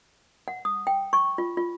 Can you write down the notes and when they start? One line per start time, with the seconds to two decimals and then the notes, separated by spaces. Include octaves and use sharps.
0.48 F#5
0.65 D#6
0.87 G5
1.13 C#6
1.38 F4
1.57 F4